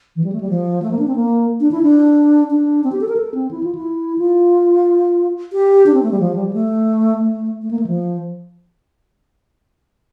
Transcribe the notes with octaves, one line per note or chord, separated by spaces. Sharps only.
E3
G3
A3
G3
F3
A3
A#3
D4
C4
A#3
D4
E4
D4
D4
C4
G4
A4
A#4
A4
C4
E4
F4
E4
F4
G4
D4
C4
A3
G3
F3
G3
G3
A3
A3
A3
A#3
A3
F3